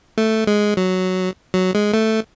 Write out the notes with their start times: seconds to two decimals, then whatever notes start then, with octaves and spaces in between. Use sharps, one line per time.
0.18 A3
0.47 G#3
0.77 F#3
1.54 F#3
1.75 G#3
1.94 A3